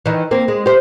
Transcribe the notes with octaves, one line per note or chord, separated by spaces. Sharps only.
D#3 E3
A#3 C4
G#3
G4 C5